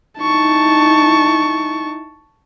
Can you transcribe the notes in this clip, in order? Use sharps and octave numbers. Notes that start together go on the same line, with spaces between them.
D#4 E4 A5 C#6